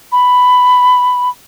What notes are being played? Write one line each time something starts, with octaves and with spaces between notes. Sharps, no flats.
B5